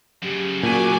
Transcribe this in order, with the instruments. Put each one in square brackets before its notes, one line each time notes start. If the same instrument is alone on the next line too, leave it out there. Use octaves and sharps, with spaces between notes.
[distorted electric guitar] F#2 C#3 [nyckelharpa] G4
[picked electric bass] A#2 [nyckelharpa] F#4 [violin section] G#5 D6